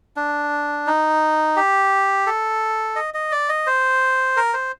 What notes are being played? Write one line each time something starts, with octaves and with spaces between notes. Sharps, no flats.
D4
D#4
G4
A4
D#5
D#5
D5
D#5
C5
A#4
C5